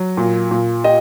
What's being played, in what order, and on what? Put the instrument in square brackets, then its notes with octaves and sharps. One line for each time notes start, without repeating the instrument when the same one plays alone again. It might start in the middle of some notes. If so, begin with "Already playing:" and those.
Already playing: [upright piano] F#3
A#2
A#2
[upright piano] G4 [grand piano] D#5